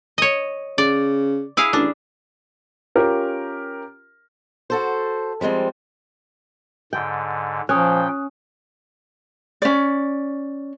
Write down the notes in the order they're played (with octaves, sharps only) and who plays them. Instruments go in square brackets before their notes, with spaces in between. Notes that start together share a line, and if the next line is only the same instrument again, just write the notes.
[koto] C#5 D#5
[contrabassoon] C#3 [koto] D5
[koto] E4 G#4 F5
[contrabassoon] A1 [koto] D4
[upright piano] C#4 F4 G4 A#4
[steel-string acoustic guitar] F#4 A4 C5
F3 G3 G#3 C4
[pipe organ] G#2 D3 [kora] G5
[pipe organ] A#2 G5 [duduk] F3 [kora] C#4 [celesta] G#5 D#6 F#6
[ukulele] C#4 D5